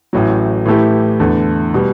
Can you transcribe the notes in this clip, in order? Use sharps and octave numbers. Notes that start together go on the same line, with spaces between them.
A1 A2 F#3
A2 E3 A3 E4 G4
E2 D3 A3
B2 G3